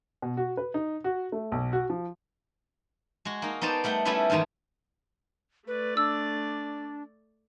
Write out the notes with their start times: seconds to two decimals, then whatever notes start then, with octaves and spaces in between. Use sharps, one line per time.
0.22 B2
0.37 F#4
0.57 B4
0.74 D#4
1.04 F#4
1.32 A3
1.52 B1
1.73 F#4
1.90 F3
3.25 G#3 F#4
3.42 A#3 D#4
3.61 B3 D#4 C5 D5 A5
3.84 G3 A3 F#5 G5
4.05 G3 A3 B3 C#4 E4 E5
4.30 E2 G#2 D#3 G#3 A3
5.67 A3 B4 D5
5.97 D4 E6